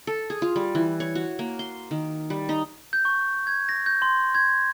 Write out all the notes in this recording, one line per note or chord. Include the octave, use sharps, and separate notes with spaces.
A4
G#4
F4
G3
E3
C#5
F#4
A#3
C6
D#3
G3
D#4
G6
C#6
G#6
A#6
G6
C6
G#6